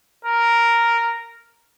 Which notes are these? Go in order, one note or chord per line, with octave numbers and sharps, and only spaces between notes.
A#4